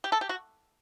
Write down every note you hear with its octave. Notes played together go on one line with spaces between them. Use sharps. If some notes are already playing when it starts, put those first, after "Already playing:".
G4
A4
G4
F#4